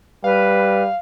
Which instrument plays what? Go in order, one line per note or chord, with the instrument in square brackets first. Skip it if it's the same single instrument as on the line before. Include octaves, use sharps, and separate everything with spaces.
[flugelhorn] G3 [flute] B4 [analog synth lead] F5